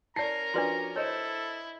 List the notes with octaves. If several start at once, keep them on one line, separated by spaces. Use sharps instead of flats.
C#4 E4 A#4 D5 A#5 C7
F3 D4 F#4 B4 D5 C6
E4 A4 C5 C#5 D#5